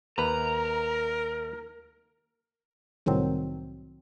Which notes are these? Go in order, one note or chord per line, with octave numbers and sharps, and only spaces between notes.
D#2 A#4 B4 A#5
C2 A2 D#3 F#3 C4